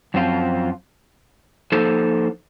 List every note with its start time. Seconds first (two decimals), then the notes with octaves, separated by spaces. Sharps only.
0.14 F#2 F3 C4 F4
1.72 F3 A#3 D#4 A4 C5